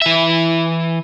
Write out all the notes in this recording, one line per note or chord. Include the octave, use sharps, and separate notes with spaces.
E3 E5